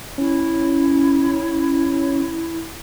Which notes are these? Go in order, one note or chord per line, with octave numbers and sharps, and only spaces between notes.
C#4 E4